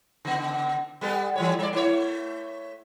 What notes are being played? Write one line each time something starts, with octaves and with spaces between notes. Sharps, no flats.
C#3 B3
G3 B3 A4
E3 G3 C#5
G3 D5
A3 E4 C#5